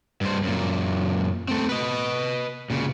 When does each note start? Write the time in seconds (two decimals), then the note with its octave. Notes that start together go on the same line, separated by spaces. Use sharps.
0.21 G2 C5
0.43 F#2 A#2
1.48 A3 C4
1.69 B4 D#5
2.70 A#2 C#3